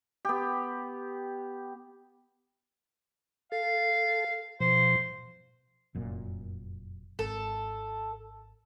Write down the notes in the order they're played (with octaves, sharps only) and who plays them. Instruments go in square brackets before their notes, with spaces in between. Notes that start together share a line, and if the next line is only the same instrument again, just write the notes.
[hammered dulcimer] B3 G4
[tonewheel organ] A4 [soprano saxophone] F5
[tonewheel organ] B2 F3 [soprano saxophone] C5
[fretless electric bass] F1 F#2 A#2
[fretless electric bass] G#1 [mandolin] A4